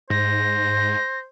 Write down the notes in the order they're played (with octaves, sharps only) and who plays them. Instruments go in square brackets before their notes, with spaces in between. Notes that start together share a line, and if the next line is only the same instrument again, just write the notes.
[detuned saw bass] G#2 [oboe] C5 [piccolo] A#6